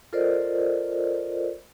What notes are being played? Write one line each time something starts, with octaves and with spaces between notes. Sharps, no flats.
F4 A4 A#4 C5 D5 D#5